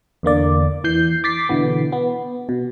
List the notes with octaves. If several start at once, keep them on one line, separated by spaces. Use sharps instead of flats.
E2 D3 A#3 D5
E3 G6 C7
D6 A6 B6 C7
B2 D3 E3 B3
B3
B2